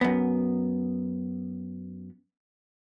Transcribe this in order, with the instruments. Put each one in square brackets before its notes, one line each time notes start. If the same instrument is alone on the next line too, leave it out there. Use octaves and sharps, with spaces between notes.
[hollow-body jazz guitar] F#2 B3